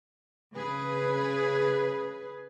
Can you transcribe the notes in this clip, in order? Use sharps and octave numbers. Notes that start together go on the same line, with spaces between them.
C#3 G#4 B4